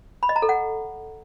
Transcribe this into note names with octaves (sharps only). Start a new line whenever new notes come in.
B5
D#5
A#5
A4
F#5